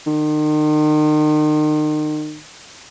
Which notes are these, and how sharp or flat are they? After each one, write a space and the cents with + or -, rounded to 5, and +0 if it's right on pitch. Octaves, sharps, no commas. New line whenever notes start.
D#3 -35